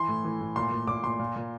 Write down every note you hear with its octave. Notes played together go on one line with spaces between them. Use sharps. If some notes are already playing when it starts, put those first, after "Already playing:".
Already playing: E3 C6
A2
E3
A2
A#2 C6
A#2
A#2 D6
A#2 C6
A#2
A#2